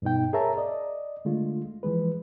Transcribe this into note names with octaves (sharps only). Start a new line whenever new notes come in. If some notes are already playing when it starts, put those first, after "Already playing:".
G2 B2 B3 D#4 G5
G#4 A#4 C#5 E5 A5 A#5
D5 D#5
D3 G#3 A3 F4
E3 F3 G#3 B4